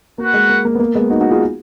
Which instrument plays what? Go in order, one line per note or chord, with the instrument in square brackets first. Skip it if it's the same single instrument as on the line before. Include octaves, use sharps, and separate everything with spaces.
[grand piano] A#3 [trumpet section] F#4 B4 F#5
[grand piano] G#3
A#3
A#3
B3
A#3
G#3 B3
D#4 F#4
D#4 F#4
F4 G#4